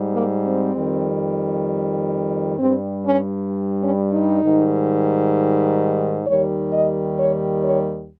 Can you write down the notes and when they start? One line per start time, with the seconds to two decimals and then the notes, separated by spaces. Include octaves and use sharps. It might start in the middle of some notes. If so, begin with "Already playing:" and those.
Already playing: G#2 G3
0.14 A#3
0.45 C4
0.75 F2 D#3 G3
2.59 G2 G3 C4
3.05 C#4
3.82 C#4
4.12 D#4
4.43 G#2 D#3 G3
6.26 D#2 D#3 G3 C#5
6.72 D#5
7.18 C#5
7.64 C#5